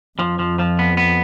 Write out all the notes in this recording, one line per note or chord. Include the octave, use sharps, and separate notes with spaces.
F2 F3
F3
F3
B3
B3